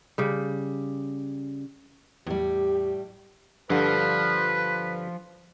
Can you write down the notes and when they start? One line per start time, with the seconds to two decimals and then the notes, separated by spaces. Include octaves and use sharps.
0.18 C#3 G3
2.27 E2 A2 G3 G4
3.70 G2 D3 F3 B4